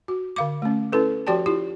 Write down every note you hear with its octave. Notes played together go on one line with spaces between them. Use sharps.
F#4
D3 F5 D6
A3 C#4
C#4 E4 A4 B4
F3 F#4 G4 D5 G5 A5
E4 F4 G4